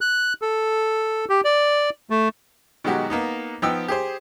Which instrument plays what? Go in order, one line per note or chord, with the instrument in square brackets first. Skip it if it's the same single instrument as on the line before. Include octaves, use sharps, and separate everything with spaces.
[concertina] F#6
A4
G4
D5
A3
[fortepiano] B2 D#3 F#3 G#3 F#4 G4
A#3 B3 D#4
F3 B3 D#4 G5 E6
G4 G#4 C5